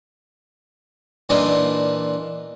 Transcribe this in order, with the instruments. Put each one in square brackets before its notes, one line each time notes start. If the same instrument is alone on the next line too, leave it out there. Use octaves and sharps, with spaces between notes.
[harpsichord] A#2 E3 D4 D#4 F4